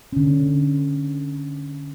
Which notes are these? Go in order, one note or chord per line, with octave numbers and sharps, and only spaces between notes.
D3 C#4